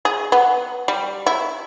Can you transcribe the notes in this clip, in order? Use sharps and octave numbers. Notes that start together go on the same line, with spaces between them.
G#4
B3
G3
E4